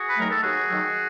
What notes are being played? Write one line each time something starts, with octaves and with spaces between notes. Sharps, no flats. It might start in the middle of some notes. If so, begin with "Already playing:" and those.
Already playing: F#4 G#4
B4
D#3 F#3 A3 A#4
A4
D#2 F#4 G#4
D#3 F#3 A3